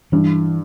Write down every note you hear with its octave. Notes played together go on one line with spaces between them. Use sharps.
G2 E3